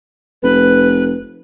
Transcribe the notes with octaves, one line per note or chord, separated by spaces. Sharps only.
F1 B4